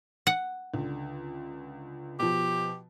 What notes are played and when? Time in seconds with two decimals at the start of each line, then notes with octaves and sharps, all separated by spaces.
0.27 F#5
0.74 C#2 D3
2.20 B2 F3 G4